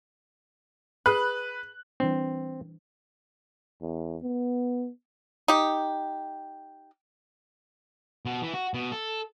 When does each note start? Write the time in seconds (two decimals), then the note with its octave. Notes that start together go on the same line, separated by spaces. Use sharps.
1.06 G#4 B4 B5 F#6
2.00 E3 G3 C4 D4
3.81 E2
4.22 B3
5.48 D#4 G4
8.25 B2
8.42 E3
8.54 F#4
8.74 B2
8.92 A4